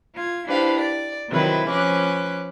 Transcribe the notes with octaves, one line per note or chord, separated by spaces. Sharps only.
F4 G#6
D4 E4 G4 B4 C5 F5
D5
C3 D#3 F#3 C4 E4 B4
F3 C#4 B4 D6 F#6